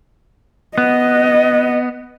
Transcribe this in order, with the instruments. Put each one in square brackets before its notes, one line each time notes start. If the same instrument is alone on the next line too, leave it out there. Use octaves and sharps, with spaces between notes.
[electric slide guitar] B3 [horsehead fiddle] D#5